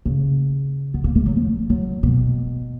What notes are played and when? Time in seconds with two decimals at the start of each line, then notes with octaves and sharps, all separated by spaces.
0.05 C#3
0.94 B3
1.04 A#3
1.15 G#3
1.26 F#3
1.37 F3
1.70 F#3
2.03 B2